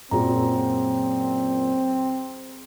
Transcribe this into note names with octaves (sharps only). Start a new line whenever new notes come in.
F#2 A#2 F#3 C4 G#4 A#5